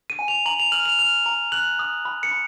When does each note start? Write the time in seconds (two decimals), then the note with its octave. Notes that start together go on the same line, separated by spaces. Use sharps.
0.10 D#7
0.19 G#5
0.28 F7
0.46 A#5 F#7
0.59 F7
0.72 F6 F#7
0.86 F7
0.99 F6 F7
1.26 A#5
1.52 F#6 F#7
1.79 D#6
2.05 B5
2.23 C#7
2.31 B5